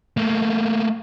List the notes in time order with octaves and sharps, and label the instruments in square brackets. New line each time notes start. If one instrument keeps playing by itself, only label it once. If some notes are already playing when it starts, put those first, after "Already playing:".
[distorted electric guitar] A3 A#3